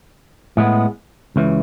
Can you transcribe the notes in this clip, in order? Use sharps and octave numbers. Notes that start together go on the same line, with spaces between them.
A2 G#3 B3
C#2 C#3 E3